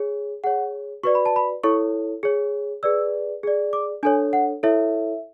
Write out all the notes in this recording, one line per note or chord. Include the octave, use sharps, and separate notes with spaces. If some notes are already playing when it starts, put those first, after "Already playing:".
Already playing: G#4 C#5
G#4 C#5 F#5
F#4 B4 D5 C#6
B5
A5
B5
E4 A4 C#5 C#6
G#4 C#5
G#4 B4 D5 E6
G#4 D5
D6
D4 A4 C#5 G#5
F#5
E4 A4 C#5 E5